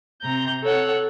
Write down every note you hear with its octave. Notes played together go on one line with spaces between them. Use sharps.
C3 A#5 G6
A4 C#5 F#5